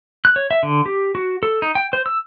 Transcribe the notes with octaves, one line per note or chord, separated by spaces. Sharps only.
F#6
C#5
E5
D3
G4
F#4
A4
D#4
G5
C5
E6